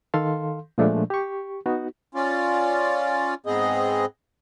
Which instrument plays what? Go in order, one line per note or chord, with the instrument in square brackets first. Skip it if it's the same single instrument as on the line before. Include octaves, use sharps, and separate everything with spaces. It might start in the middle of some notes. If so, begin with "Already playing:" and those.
[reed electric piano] D#3 A4 F5 C6
A#2 F3 G#3 A3 D4
G4 C#6
B3 D#4 F#4
[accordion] C#4 F4 D5
G#2 B3 C4 G#4 D#5